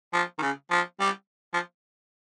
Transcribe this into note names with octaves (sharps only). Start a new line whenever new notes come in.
F3
D#3
C#3
F3
G3
F3